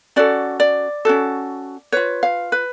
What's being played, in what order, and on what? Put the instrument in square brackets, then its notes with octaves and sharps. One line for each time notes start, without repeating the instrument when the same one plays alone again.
[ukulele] C#4 F#4 A4 D5
D5
C#4 F#4 A4
F4 B4 C#5
F5
B4